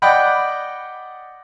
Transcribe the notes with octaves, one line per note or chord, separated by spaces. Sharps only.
D5 D#5 F#5 G5 B5